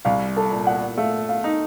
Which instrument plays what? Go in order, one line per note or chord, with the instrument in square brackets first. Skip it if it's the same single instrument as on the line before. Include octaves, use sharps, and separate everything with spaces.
[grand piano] C2 [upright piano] F5
[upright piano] A4
[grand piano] A#2
[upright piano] F#5
[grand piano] A3 [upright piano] F5
[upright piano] F5
[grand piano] D#4